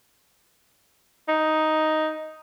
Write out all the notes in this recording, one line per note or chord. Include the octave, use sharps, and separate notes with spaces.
D#4